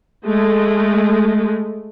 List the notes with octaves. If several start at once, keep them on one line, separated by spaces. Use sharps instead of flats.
G#3 A3